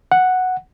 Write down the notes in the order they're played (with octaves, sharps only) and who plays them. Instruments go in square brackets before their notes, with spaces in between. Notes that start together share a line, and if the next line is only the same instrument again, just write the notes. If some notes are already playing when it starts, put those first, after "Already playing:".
[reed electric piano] F#5